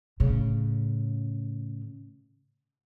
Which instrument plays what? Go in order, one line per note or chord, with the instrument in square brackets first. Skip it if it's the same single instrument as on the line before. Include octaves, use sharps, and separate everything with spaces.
[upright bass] A2 C#3